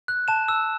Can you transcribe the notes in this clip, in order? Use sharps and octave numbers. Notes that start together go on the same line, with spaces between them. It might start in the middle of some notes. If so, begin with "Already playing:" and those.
F#6
A5 E7
E6